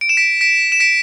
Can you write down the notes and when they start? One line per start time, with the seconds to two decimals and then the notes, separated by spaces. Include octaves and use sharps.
0.01 D7
0.09 E7
0.17 B6 D7
0.41 B6 D7
0.72 E7
0.80 B6 D7